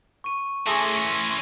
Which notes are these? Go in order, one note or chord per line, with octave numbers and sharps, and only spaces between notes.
C#6 D#7
E3 A3 C#4 G#4 C6 E6 A#6